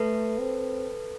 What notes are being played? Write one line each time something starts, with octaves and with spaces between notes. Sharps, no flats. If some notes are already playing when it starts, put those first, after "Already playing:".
Already playing: A3 A4 B4
C4